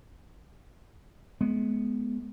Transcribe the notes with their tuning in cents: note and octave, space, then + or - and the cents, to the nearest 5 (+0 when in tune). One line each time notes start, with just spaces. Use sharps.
G#3 +30 B3 +0